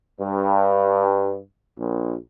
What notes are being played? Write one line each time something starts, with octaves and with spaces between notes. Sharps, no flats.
G2
A#1